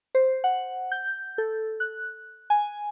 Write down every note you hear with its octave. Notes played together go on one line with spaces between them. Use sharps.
C5
F#5
G6
A4
F#6
G#5